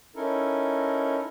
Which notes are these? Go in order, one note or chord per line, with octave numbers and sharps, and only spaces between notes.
C#4 D#4 E4 A4 A#4